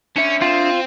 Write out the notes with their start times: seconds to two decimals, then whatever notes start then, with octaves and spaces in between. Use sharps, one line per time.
0.17 C#4 D4 E5
0.42 C4 F4